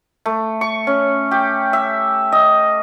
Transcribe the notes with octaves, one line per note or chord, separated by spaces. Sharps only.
A3
C#6
C#4
G4
E5
D#5